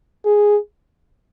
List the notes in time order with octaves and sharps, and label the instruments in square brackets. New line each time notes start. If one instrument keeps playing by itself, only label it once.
[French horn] G#4